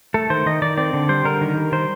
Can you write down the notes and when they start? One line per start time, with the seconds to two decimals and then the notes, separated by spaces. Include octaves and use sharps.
0.14 A3 A4
0.30 D#3 C5
0.46 D#3 D#5
0.62 D#3 D5
0.78 C4 D5
0.93 D3
1.09 G3 C5
1.25 D3 A#4
1.41 D#3
1.56 G3
1.72 D#3 C5